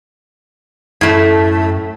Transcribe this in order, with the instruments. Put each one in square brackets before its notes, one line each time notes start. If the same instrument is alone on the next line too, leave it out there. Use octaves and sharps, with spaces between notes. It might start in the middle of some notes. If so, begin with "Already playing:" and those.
[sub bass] F#2 [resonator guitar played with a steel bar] A2 A3